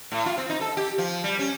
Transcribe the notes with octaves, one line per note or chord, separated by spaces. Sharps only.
A2
F4
C4
D#4
A4
G4
F3
G3
C#4